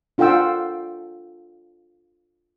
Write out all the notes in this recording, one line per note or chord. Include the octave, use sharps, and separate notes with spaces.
D4 F4 A4 F#5 G5 E6